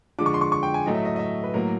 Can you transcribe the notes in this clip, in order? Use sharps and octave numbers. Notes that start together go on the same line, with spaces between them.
D3 F3 G#3 D6
C#6
C6
C#6
C#6
G5
G#5
A2 F#3 A3 D#5
E5
D#5
D#5
E5
B4
A2 F#3 A#3 A#4